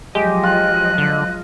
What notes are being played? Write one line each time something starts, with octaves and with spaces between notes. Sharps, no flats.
F3 F#3 G#3 G4 D#5
F4 F#6
D3